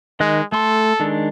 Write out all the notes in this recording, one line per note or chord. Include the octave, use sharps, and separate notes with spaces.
D#3 G#3 D#5 F#6
A3 A4 C6
D#3 G#3 D4